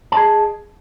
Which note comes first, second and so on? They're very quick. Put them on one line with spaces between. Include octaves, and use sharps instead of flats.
A5 D#5 G#4